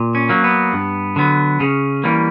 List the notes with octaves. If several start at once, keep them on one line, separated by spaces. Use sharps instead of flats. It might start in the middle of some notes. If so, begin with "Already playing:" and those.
Already playing: A#2
C#4
F#3 A#3
B3
G2
D3 F#3 B3
C#3 C#4
E3 G3 A#3